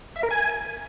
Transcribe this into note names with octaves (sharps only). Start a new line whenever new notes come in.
E5
A#4
G#5